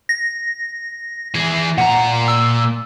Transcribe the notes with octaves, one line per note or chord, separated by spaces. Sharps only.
A#6
E3 G#4
A#2 F#5 A#5
E6